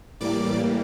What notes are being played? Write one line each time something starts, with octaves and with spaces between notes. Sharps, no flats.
A2 E3 G3 A#3 D5 D6